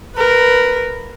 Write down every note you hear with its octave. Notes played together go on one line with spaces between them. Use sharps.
A#4 B4